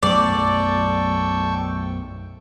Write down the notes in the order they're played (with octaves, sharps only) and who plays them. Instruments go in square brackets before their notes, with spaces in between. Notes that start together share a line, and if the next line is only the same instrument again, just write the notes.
[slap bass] B1 F#2 A3 [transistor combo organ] A4 G5 C#6 [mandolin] D5